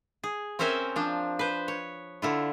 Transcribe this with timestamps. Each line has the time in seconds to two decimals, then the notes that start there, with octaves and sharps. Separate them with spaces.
0.24 G#4
0.59 C4 C#4 A#4 C5 E5 G#5
0.96 F3 D4
1.39 B4 C5
1.68 C#5
2.22 D3 E4 F4